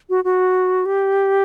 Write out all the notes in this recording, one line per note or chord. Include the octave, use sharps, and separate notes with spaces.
F#4
F#4
G4